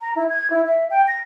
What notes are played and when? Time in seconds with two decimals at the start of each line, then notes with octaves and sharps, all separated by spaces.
0.01 A#5
0.16 E4
0.30 G#6
0.50 E4
0.66 E5
0.90 G5
1.08 A#6